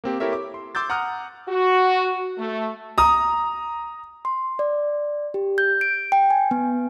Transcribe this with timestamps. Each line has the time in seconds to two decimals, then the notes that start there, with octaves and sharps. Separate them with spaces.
0.04 A#3 C4 G4
0.20 E4 G4 A4 A#4 C#5 E5
0.33 D6
0.54 C6
0.75 C6 D6 E6 G6 A6
0.90 F#5 A#5 D6 D#6 F6 F#6
1.48 F#4
2.38 A3
2.98 A#5 D#6
4.25 C6
4.59 D5
5.34 G4
5.58 G6
5.81 D7
6.12 G5
6.31 G#5
6.51 B3